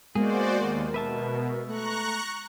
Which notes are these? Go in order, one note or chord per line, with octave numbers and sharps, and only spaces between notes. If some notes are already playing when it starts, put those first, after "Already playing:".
G#3 A#3 B3 F#4 G#4 A#4 C5 D5
D#2 A#4
B2 B4 E5 A5
A3 A#5 C#6 F#6